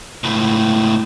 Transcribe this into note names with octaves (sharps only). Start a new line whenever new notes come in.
C#2 A2